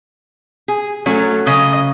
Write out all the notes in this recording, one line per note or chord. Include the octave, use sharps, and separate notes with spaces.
G#4
F#3 A3 C#4
C#3 D#5